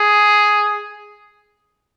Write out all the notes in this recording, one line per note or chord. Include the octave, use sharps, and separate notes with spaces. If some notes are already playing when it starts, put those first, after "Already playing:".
Already playing: G#4